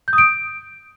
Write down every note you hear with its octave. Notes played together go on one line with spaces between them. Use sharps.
G6
D#6
D7